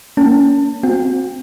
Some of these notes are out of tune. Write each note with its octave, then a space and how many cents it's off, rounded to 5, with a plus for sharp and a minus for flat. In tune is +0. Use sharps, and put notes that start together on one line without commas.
A#3 +0 C#4 +30 A5 +25
C4 +0 F#4 -25 G5 +20